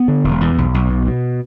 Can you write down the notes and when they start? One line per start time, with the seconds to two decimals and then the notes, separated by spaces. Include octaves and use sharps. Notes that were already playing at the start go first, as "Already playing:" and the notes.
Already playing: B3
0.08 D3
0.24 E1
0.41 E2
0.58 B1
0.74 B1
0.90 B2
1.08 B2